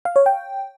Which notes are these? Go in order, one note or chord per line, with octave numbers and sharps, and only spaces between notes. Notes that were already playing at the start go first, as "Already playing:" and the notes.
F5
C#5
G5